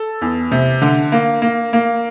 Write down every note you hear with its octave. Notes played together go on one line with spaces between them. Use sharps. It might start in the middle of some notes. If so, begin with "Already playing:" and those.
Already playing: A4
E2
C3
D3
A#3
A#3
A#3